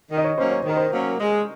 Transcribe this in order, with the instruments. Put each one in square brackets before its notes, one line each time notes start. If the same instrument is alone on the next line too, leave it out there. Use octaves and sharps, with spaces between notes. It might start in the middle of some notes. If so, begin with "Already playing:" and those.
[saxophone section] D#3
[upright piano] D#5
C#5
[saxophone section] F#3 A#3 C#4 [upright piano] C5
[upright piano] C#5
C5
[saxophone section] D#3 [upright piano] A#4
[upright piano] C5
[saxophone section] F#3 A#3 C#4
G#3